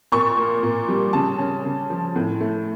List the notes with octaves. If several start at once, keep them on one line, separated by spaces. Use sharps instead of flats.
A#2 C#6
A#3
A#2
G3
C#3 A5
C#4
C#3
F3
A2
A3